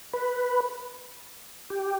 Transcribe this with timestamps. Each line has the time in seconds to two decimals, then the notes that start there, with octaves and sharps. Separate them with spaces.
0.13 B4
1.70 G4